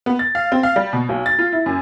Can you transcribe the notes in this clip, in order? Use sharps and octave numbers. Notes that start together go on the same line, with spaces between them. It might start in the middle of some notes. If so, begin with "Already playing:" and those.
B3
A6
F5
C4
F5
G3
B2
B1
A6
F4
E4
F#2